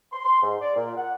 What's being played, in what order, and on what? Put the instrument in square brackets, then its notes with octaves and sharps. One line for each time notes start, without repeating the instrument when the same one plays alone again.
[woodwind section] C6
C6
G#2
D5
A#2
F#5